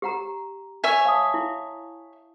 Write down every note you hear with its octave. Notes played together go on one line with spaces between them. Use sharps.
G4 F#5 A#5
C#5 E5 G#5
F5 A5 D#6
E4